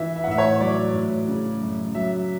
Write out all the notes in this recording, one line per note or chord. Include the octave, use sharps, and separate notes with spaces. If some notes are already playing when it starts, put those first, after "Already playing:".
Already playing: E3 E5
E5
F#5
A2 E5
C#5
F#3 D5
A2
C#3
F#2
F#3 E5